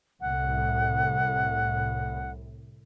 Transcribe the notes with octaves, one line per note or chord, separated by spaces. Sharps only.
C2 A2 F#5